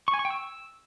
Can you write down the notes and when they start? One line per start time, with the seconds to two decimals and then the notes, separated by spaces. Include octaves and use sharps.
0.08 C#6
0.14 G#5
0.19 C#6
0.25 G5
0.31 E6